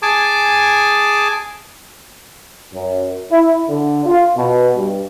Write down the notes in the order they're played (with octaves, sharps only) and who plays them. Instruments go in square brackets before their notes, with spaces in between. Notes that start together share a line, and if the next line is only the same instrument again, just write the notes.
[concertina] G#4 G#5 A5 D6
[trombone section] F#2
E4
D3
F4
B2
G2